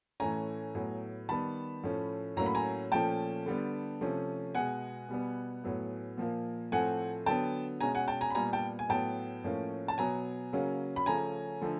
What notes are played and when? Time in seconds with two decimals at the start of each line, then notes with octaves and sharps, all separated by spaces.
0.20 A2 E3 A3 C#4 G#5 A#5
0.75 A2 F#3 B3
1.29 D#3 G3 B3 A5 B5
1.83 A2 F3 A3 C#4
2.37 A2 F#3 A#3 C#4 A#5
2.46 B5
2.55 G#5 A#5
2.91 A#2 F3 A3 C#4 G5 A5
3.46 D3 G3 B3
4.01 C3 F3 A3 C#4
4.54 B2 G#3 B3 F#5 G#5
5.09 B2 G3 B3
5.64 A2 F#3 B3
6.17 A#2 F3 A#3
6.72 A2 F3 A3 C4 F#5 G#5
7.26 D3 F#3 B3 G5 A5
7.80 B2 G#3 C#4 G#5 A#5
7.95 F#5 G#5
8.08 G5 A5
8.21 G#5 A#5
8.30 B5
8.35 A#2 G3 B3 G#5 A#5
8.53 G5 A5
8.79 G#5
8.89 A2 F#3 B3 G5 A5
9.44 A2 F3 A#3 C#4
9.88 A5
9.98 B2 F#3 B3 G#5 A#5
10.53 C#3 F#3 A#3 C#4
10.96 B5
11.06 C#3 F3 A3 C#4 G#5 A#5
11.61 D3 F3 A3